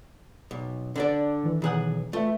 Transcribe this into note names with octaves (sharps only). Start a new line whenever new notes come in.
B1
D3 D4 D5
D#3 E3
B1 G#4 F#5
A3 F4 B4 E5